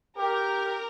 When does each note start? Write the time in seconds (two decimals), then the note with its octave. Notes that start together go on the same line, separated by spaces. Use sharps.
0.18 G4 A#4